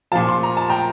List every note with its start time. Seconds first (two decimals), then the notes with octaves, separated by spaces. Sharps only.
0.12 A#2 F3 F5 A5
0.29 C6
0.43 A#5
0.57 A5
0.69 G5 A#5